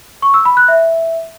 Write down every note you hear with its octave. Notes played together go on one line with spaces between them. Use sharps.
C#6
E6
B5
F#6
E5